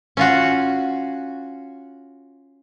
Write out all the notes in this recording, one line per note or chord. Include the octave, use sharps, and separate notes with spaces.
C#4 F4 F#4